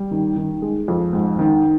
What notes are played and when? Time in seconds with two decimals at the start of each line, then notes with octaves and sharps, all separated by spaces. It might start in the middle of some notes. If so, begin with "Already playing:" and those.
Already playing: G3
0.11 D#3
0.36 D#3
0.62 G#3
0.88 F2
1.13 G#2
1.39 D#3